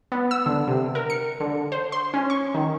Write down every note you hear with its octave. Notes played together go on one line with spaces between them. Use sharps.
B3
E6
D3
C3
A#4
C#7
D3
C5
C6
C#4
C#6
D#3